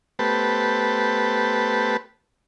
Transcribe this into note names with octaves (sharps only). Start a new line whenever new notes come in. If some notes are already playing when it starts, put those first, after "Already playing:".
A3 B3 G4 B4 C5 A5